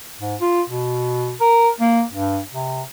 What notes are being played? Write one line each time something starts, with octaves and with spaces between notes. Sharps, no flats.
G#2
F4
B2
A#4
A#3
G2
C3